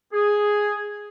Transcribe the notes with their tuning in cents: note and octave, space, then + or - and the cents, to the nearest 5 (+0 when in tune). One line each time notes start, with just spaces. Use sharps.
G#4 +0